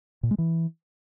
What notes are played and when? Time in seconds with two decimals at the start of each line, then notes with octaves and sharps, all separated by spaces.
0.23 A#2
0.31 G#3
0.38 E3